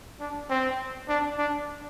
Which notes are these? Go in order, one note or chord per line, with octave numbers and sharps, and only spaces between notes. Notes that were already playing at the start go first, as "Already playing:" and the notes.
D4
C4
D4
D4